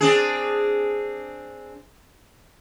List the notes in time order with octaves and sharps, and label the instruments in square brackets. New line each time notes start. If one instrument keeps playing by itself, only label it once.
[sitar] C4 D4 G#4